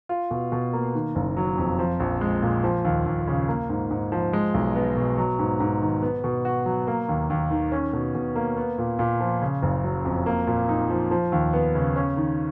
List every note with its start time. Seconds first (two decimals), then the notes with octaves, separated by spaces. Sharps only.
0.09 F4
0.31 B2
0.52 B2
0.73 A#3
0.94 D#3
1.15 F#1
1.37 F#3
1.58 F2
1.79 F3
2.00 A#1
2.21 G#3
2.42 A#2
2.64 F3
2.85 D#2
3.06 D#2
3.27 C#3
3.49 A#3
3.70 G#2
3.91 G#2
4.12 F3
4.33 G#3
4.54 B1
4.76 B3
4.97 B2
5.18 F#3
5.39 G#2
5.60 G#2
5.81 D#3
6.02 B3
6.24 B2
6.45 F#4
6.66 F#3
6.87 A#3
7.09 D#2
7.30 D#2
7.51 D#3
7.72 C#4
7.93 B2
8.15 B2
8.35 A#3
8.57 B3
8.78 A#2
8.99 A#2
9.20 F3
9.41 C#3
9.62 F#1
9.84 F#3
10.05 F2
10.26 A#3
10.47 A#2
10.69 D#4
10.90 F3
11.11 F3
11.32 D#2
11.53 B3
11.75 C#3
11.96 C#4
12.17 D#3